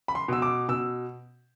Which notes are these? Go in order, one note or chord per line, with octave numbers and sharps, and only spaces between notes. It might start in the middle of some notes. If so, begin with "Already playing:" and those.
B5
C6
B2 E6
D6
B2 E6